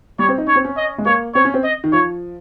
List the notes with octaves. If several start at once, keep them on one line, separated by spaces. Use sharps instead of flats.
G3 C#5
C4
D#4
C#4 C#5
C4
C#4
D#5
G#3
A#3 C#5
C4 C#5
C#4
C4
D#5
D#3
F3 C#5